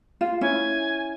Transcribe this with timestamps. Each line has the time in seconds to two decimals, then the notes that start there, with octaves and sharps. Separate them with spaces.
0.21 F4
0.41 C#4 E4 G#5